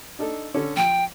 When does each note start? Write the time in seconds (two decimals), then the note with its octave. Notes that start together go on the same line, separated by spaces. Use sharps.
0.19 D4 D#4 A4
0.54 D3 C#4 A4
0.77 F3 G5